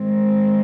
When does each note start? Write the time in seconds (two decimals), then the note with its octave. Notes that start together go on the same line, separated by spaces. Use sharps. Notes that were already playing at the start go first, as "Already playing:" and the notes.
Already playing: G#2 D#3 G#3 C4